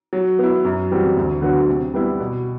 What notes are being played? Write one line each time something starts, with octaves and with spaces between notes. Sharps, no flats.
F#3
B3 E4
F#2
E3 G3 C4 F#4
D2
D3 F#3 B3 F#4
C3
G3 B3 E4
B2